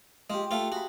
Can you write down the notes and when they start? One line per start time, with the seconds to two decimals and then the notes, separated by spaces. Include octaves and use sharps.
0.30 G#3 F4 G4
0.51 A3 F4 F5 F#5 A5
0.72 F#4 G#4 B5